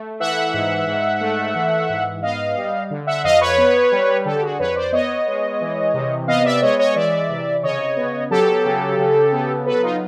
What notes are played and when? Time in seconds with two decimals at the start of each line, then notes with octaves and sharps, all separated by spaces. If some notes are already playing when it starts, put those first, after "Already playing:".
Already playing: A3
0.20 E3 E5 F#5
0.54 G#2
0.87 G#2
1.21 A3
1.55 E3
1.89 G#2
2.23 B3 D#5 F5
2.57 G3
2.91 D3
3.07 E5 F#5
3.24 F2 D#5 F5
3.41 B4 C#5
3.58 B3
3.92 G3
4.25 D3 G4 A4
4.36 G4
4.42 F#4 G#4
4.59 F2 B4 C#5
4.76 C5 D5
4.92 B3 C#5 D#5
5.27 G#3
5.61 E3
5.94 C3
6.28 B3 D#5 F5
6.45 D5 E5
6.62 G#3 C#5 D#5
6.79 C#5 D#5
6.95 E3 D5 E5
7.29 C3
7.63 C#3 C#5 D#5
7.97 B3
8.31 F#3 G4 A4
8.65 C#3
8.99 C#3
9.32 B3
9.66 F#3 A4 B4
9.83 D#4 F4